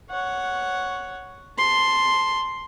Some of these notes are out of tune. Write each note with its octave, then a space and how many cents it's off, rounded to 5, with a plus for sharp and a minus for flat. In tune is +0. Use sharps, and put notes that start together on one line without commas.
C#5 +5 F#5 +0
A5 +0 C6 +0